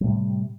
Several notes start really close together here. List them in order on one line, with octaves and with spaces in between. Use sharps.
F#3 A2 G3 C3